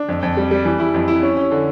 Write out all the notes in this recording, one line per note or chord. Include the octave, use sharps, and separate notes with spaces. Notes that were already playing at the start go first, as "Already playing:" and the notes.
Already playing: D4
F2
F2
G3
G3
E3
E4
F2
E4
C#4
C#4
D3